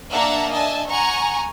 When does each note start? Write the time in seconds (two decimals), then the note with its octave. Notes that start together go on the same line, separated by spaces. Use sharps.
0.11 A#3 D4 E5 F#5 A5 A#5
0.52 D4 D#5 E5 G#5 A5
0.88 F#5 G#5 A#5 C#6